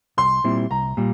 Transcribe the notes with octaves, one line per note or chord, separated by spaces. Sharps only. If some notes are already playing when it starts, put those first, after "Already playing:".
C2 C6
A#2 G3 C4 E4
C2 A#5
A#2 G3